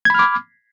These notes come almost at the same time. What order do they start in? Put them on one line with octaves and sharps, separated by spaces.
G#6 B5 F6 D6